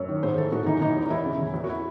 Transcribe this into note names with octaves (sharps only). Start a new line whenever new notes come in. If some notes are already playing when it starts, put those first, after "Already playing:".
Already playing: F#2
D#3
G#2 C5
E3 A4
G#2 F#4
E3 D#4
E3 D#4
E2
D#4
E2 E4
C#3
E3
E2
F#4
E4